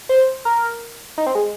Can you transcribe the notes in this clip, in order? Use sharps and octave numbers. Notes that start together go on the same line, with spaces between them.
C5
A#4
D#4
C4
G#3